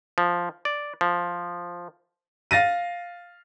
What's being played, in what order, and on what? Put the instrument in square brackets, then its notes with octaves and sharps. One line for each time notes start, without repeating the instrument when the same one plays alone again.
[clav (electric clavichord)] F3
D5
F3
[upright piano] F5 A6 A#6 D#7